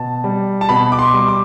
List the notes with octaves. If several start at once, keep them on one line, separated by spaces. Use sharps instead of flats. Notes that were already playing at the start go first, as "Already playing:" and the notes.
Already playing: B2 A5
G3
A5
B2 B5
D6
C6
G3
D6